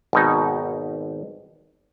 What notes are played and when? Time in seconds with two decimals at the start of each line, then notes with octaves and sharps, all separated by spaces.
0.13 G#1 B2 D#4